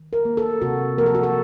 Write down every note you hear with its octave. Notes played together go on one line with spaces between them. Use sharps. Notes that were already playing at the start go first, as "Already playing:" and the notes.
Already playing: D#3
A#4
A#3
A4
C3 F#4
F3 A#3 A#4
A4
F#4
A4